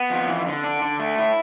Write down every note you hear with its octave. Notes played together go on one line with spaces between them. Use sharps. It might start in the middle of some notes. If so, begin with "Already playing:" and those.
Already playing: B3
F2
E3
D3
D4
D3
A3
E4